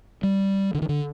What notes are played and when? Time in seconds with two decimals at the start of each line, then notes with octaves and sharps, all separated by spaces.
0.23 G3
0.74 D3
0.82 D#3
0.89 D3